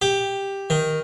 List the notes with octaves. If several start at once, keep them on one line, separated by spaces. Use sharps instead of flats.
G4
D#3